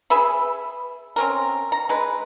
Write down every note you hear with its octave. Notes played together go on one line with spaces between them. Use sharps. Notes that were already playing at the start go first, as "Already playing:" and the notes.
G#4 B4 E5 B5
C4 C#4 A#4
A#5
G#3 B4